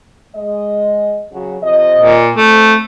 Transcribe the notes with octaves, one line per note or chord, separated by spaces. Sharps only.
G#3 D#5
C#3 F#3 F#4
C3 F3 D#5
A#2
F2 A3